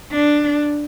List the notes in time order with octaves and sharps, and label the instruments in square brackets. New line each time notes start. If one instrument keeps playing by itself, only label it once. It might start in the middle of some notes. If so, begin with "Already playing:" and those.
[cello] D4